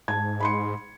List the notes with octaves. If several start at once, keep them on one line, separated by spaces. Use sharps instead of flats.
G#2 A5 G#6
B5 C6 C#7